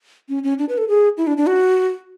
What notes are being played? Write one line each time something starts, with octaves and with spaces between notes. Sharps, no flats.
C#4
C#4
D4
B4
A4
G#4
E4
D4
D4
F#4